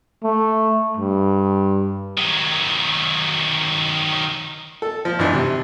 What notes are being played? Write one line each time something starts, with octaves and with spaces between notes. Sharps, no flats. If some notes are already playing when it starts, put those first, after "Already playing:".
A3
G2
D#3 F#3
A4
F3
G#1 E3 D4
C3